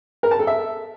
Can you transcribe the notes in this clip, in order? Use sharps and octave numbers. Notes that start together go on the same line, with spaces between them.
A#4
A5
A4
E5